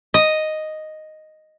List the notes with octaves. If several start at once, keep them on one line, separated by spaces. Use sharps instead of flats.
D#5